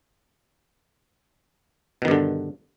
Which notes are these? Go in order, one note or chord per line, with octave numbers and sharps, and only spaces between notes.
G2 B2 D3 D#3